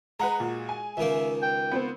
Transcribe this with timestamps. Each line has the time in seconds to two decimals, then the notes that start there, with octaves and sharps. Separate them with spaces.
0.20 G#3 B4 F#5 A#5
0.40 A#2 F#4
0.69 G#5
0.97 C#2 D#3 A#3 E5
1.42 G5
1.71 B3 C4 C5